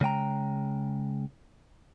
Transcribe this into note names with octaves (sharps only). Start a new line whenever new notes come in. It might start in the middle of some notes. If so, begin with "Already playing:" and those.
C#3 G#3 G5 A#5